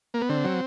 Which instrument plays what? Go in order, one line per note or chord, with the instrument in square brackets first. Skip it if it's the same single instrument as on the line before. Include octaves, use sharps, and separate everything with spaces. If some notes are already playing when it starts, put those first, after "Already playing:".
[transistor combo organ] A#3
B3
D3 C4
F#3